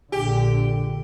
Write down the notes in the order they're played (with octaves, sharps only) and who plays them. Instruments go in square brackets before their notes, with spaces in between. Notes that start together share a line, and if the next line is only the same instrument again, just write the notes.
[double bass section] A#1 A#2 D3 [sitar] G4